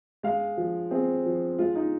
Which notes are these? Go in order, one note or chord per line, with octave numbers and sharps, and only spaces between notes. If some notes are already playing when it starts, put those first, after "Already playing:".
G#3 F5
F3
C4 G#4
F3
G#3 F4
D#4